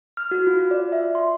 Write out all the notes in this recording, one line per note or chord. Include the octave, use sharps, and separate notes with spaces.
F6
F#4
F4
F4
D5
E5
C6